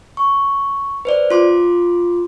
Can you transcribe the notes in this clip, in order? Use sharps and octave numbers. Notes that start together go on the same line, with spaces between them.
C#6
B4 C5 D5
F4 C6 D6